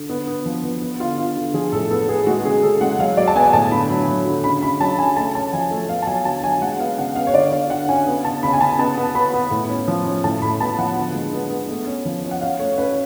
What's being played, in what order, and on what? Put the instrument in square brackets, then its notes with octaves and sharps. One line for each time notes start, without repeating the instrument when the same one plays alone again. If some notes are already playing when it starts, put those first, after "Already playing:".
Already playing: [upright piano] D3
B3
B3
F3
B3
B3
D3 F4
D3 F4
D3
F3 G#4
A2 A4
B3 A4
B3 G#4
G#3 F#4
C#3 G#4
C#3 A4
G#3 F#5
F#3 F5
F#3 D5
A5
B3 G#5
A2 A5
D3 B5
F#3
F#3
D3
C#3 B5
C#3 B5
F#3 A5
C#3 G#5
A3 A5
C#4 A5
F3 G#5
A3
B3 F5
A5
F#3 G#5
D3 A5
F#3 G#5
G#3 F#5
B3 F5
C#3 F#5
B3 F5
C#5
D3 D5
D3 F5
D3 F#5
C#4 G#5
B3
C#3 A5
C#3 B5
G#5
C#3 A5
B3 A5
B3
B3 B5
B3
A2
C#4
F3
C#4
A2 A5
A2 B5
B3 A5
F3 F#5
D3
G#3
B3
B3
A3
C#4
F3
C#4
F#5
C#4 F5
A3 C#5
C#4 B4